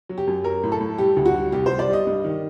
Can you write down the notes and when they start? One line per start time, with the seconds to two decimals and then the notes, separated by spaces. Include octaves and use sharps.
0.09 F#3
0.18 G4
0.27 F#2
0.44 F#3 A#4
0.63 A2
0.72 A4
0.80 A2
0.98 G3 G4
1.17 D2
1.25 F#4
1.34 G3
1.52 C2 G4
1.66 G3 C5
1.79 D5
1.89 G3 D#5
2.07 G2
2.24 D#3